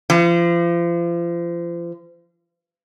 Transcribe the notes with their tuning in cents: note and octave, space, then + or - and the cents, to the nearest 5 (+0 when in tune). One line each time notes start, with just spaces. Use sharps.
F3 -35